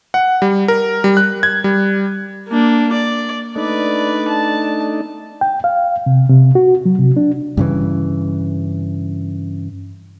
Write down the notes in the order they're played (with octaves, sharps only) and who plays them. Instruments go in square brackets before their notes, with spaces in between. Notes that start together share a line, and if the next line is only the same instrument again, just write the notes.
[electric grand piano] F#5
G3
A#4
G3
F#6
G#6
G3
[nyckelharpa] A#3 D4
D5
[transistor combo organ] A3 D4 D#4 [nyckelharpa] B4 D5
[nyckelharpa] A5
[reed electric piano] G5
F5
C3
C3
F#4
F#3
C3
D4
[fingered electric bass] G2 C#3 E3